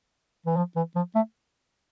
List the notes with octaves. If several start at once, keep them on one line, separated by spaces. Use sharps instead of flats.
E3
F3
E3
F3
A3